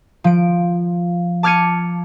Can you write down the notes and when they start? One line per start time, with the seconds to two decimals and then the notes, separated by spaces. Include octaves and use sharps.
0.24 F3 D7
1.43 A5 D6 F6 G#6 C#7 D#7